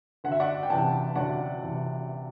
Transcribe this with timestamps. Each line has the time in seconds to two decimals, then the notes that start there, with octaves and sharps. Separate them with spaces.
0.24 D2 F#5
0.32 E5
0.40 D5 F#5
0.63 G5
0.70 C3 E3 F#5 A5
1.15 D2 D5 F#5
1.61 C3 E3